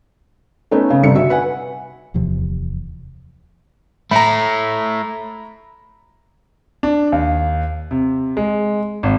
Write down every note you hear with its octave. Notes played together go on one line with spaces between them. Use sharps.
A3 B3 C#4 D#4
C#3
G1 C3 C#7
F#4 E5
B4 F#5 G#5
D1 E2 C3 F3
A3 E4 A#5 B5
D4
D#2
C3
G#3
G#1